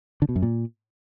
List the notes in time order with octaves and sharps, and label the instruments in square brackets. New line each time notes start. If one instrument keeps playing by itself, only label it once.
[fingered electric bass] D3
B2
F#2
A#2